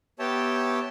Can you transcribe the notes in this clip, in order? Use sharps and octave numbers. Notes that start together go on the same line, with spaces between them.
B3 G4 C#5 E5 G5 A5